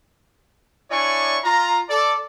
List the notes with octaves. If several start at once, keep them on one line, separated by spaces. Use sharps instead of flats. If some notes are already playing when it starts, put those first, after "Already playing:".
D4 E4 C#5 D5 G#5 C#6
F4 A#5
A4 D5